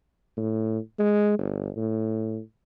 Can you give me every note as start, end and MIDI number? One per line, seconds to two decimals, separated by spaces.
0.37 0.78 45
0.99 1.35 56
1.38 1.70 31
1.77 2.40 45